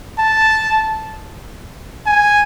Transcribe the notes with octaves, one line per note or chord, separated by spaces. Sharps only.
A5
G#5